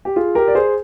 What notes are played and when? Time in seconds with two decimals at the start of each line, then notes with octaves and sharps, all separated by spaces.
0.05 G4
0.16 F4 G#4
0.35 G4 A#4
0.48 D5
0.55 G#4 C5